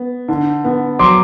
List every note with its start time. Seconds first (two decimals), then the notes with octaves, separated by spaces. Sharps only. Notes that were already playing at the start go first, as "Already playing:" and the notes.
Already playing: B3
0.28 D3
0.64 B3
0.99 F#3 C6 D6